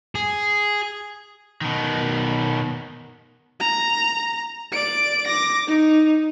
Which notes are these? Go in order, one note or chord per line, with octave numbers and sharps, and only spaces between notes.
G#4
B2 D#3
A#5
D5 D7
D6 A#6
D#4